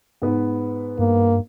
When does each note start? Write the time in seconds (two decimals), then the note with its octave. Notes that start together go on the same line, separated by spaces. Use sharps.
0.22 G#2 B3 B4
0.99 G2 A#3